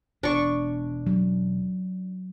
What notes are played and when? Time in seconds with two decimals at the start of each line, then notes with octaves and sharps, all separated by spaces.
0.23 E1 B3 D4 C#6
1.07 F#3